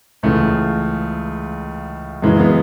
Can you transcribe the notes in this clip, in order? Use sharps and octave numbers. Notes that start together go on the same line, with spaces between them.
C#2 C#3 E3 A3
F#2 C#3 E3 G#3
G#3 B3